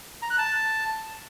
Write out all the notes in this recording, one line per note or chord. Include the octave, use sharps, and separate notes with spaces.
A#5
F#6
A5